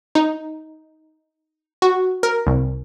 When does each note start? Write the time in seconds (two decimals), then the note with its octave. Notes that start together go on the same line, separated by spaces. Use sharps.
0.15 D#4
1.82 F#4
2.23 A#4
2.47 C2